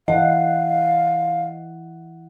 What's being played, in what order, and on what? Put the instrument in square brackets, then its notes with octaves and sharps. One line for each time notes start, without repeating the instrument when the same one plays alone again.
[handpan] E3 E4 F#5 [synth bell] D#5 [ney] F5